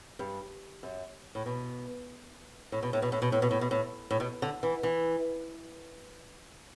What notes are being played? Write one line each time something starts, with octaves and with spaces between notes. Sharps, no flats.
G2
F#2
A2
B2
A2
B2
A2
B2
A2
B2
A2
B2
A2
B2
A2
A2
B2
D3
E3
E3